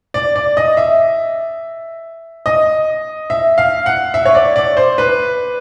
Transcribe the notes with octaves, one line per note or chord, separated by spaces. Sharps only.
D5
D5
D#5
E5
D#5
E5
F5
F#5
E5
C#5
D5
D5
C5
B4